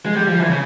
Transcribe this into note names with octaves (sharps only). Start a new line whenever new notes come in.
G#3
G3
F3
E3
C#3